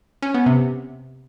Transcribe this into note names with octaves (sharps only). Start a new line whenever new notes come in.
C#4
B3
C3